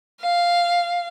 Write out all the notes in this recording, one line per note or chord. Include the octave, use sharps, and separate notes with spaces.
F5